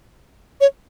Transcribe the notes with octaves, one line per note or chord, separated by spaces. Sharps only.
C#5